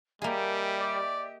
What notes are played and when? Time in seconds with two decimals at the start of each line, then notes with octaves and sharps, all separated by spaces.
0.22 G3 A#3 G4 G#4 D#5 E5
0.80 D5